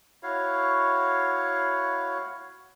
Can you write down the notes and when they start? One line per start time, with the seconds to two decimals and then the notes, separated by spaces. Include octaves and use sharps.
0.23 E4 F#4 C#5 F5